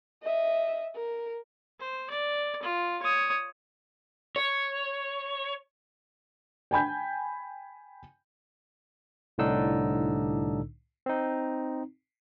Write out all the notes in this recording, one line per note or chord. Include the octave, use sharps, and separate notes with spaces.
D#5 E5
A#4
C5
D5
F4
C#5 D#6
C#5
G5 G#5 B5 G6
C2 A2 D3 D4 D#4 E6
C4 D#4